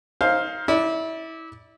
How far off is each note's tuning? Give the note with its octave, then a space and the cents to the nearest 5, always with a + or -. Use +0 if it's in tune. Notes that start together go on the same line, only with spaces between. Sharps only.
D#4 +25 C5 +15 F5 +0
E4 -25 D5 +0